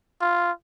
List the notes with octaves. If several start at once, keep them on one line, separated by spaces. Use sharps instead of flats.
F4